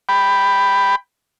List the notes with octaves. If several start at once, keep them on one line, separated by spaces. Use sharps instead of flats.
G5 B5